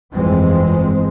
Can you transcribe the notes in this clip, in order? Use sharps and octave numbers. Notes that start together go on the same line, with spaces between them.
G1 F2 E3 G#3 C4